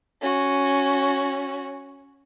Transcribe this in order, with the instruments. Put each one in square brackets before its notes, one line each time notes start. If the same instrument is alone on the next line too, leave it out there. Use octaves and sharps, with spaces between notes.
[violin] C#4 F#4